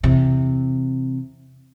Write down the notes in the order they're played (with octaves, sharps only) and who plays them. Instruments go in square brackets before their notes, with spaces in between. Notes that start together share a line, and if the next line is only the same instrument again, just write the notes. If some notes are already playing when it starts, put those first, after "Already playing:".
[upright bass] E2 C3